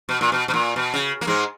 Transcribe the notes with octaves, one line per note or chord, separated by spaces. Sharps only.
B2
A#2
B2
B2
A#2
B2
C#3
A#3
G#2 G#3